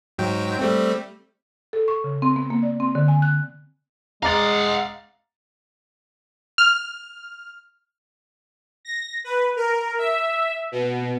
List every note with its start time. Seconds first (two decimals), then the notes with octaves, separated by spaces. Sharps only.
0.18 G#2 F#3 G5
0.59 G3 A3 C4
1.73 A4
1.88 C#6
2.04 C#3
2.22 C4
2.36 B3
2.50 A#3
2.63 D5
2.80 C4
2.95 D3
3.08 G#5
3.22 F#6
4.23 G#3 F5 F#5 A#5 D6 A6
6.58 F6
8.85 A#6
9.24 B4
9.56 A#4
9.99 E5
10.72 B2